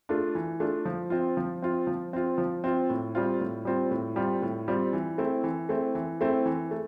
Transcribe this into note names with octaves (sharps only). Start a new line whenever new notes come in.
A3 D4 F4
E3
A3 D4 F4
F3
C4 F4
F3
C4 F4
F3
C4 F4
F3
C4 F4
A2
G3 C4 F4
A2
G3 C4 F4
A2
G3 C4 F4
A2
G3 C4 F4
E3
A3 C4 E4
E3
A3 C4 E4
E3
A3 C4 E4
E3
A3